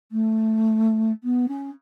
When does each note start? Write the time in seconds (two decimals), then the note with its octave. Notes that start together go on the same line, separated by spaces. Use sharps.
0.12 A3
1.24 B3
1.48 C#4